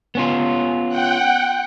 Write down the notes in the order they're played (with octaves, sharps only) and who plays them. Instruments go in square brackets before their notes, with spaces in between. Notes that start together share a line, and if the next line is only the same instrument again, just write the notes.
[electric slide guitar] B3 C#4 F4
[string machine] F#5 G5 F#6